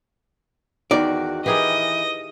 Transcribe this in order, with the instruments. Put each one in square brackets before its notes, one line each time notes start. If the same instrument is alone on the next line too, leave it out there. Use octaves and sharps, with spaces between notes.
[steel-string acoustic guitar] E2 F#4 [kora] D#3 [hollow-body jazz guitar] D5
[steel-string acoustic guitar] E3 [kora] G4 G#4 A#4 [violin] D#5